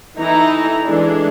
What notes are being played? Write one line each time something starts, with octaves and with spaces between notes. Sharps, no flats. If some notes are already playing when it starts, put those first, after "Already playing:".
E3 D#4 E4 A4 A#5
E3 G#3 D4 A4